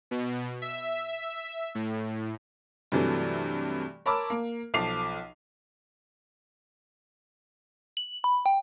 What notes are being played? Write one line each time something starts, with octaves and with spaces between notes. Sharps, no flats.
B2
E5
A2
G2 C3 E3 F#3 A3
A#4 C#5 A5 B5 D6 E6
A#3
B1 F3 A4 D6 C7 F7
F#7
B5
G5